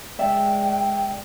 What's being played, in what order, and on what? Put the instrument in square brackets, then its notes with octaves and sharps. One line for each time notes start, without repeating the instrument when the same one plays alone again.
[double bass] G#3 [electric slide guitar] D5 E5 [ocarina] G5